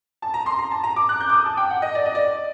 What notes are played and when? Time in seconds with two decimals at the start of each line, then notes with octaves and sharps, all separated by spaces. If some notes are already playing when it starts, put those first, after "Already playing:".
0.22 A5
0.34 A#5
0.46 C6
0.58 A#5
0.71 A5
0.84 A#5
0.96 D6
1.09 F#6
1.21 G6
1.30 D6
1.33 D#6
1.46 A5
1.57 G5
1.70 F#5
1.82 D#5
1.95 D5
2.06 D#5
2.15 D5